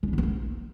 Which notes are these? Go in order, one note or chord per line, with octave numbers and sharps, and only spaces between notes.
F4
D4
D3
B3
A#3